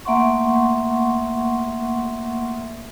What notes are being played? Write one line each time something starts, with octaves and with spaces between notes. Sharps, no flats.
A3 A#3 E5 F#5 C6 C#6